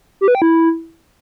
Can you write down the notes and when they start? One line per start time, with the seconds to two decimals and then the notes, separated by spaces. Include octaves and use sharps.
0.21 G4
0.28 B4
0.35 G5
0.42 E4